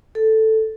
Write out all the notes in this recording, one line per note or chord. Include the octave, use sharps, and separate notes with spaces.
A4